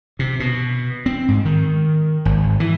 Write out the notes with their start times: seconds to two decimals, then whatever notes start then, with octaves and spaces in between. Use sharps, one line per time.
0.19 C3
0.40 B2
1.06 C4
1.28 G#2
1.45 D#3
2.25 G#1
2.60 E3